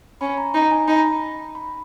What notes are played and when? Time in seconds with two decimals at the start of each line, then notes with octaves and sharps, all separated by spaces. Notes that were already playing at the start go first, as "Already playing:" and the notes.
0.21 C#4 B5
0.38 A#5
0.54 D#4 A#5
0.71 G#5
0.80 A#5
0.88 D#4 B5
1.55 B5